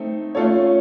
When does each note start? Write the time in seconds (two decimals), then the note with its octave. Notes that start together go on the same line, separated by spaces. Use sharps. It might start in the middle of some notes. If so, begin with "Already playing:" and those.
Already playing: A3 C4 D#4
0.35 A3 C#4 F4 A4 C#5